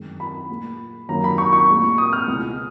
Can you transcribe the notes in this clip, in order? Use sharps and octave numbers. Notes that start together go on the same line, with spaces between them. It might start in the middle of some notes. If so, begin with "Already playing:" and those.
Already playing: F#2 D#3 G#3
B5
A#2 G#3
F#2 D#3 F#3 A#3 A#5
B5
C#6
C#6
A#2 G#3
D#6
F6
C#2 B2 G#3